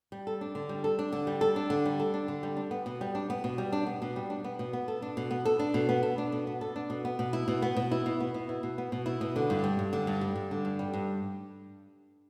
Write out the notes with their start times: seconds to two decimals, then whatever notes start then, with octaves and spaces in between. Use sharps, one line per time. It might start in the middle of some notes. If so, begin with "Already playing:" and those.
0.12 G3
0.27 A4
0.41 D4
0.55 D3
0.69 G3
0.84 A4
0.99 D4
1.12 D3
1.27 G3
1.41 A4
1.56 D4
1.70 D3
1.85 G3
2.00 A4
2.14 D4
2.28 D3
2.43 G3
2.57 D4
2.71 B3
2.86 B2
3.01 G3
3.15 D4
3.30 B3
3.44 B2
3.58 G3
3.72 D4
3.87 B3
4.02 B2
4.16 G3
4.30 D4
4.44 B3
4.59 B2
4.73 B3
4.88 A4
5.02 D4
5.17 B2
5.31 B3
5.45 A4
5.59 D4
5.74 B2
5.89 B3
6.03 A4
6.18 D4
6.32 B2
6.47 B3
6.61 A4
6.76 D4
6.90 B2
7.05 B3
7.19 B2
7.33 E4
7.48 B2
7.62 B3
7.76 B2
7.91 E4
8.06 B2
8.20 B3
8.34 B2
8.49 E4
8.63 B2
8.78 B3
8.92 B2
9.06 E4
9.21 B2
9.36 D3
9.50 G2
9.64 G3
9.79 G2
9.93 D3
10.07 G2
10.21 G3
10.36 G2
10.51 D3
10.65 G2
10.79 G3
10.94 G2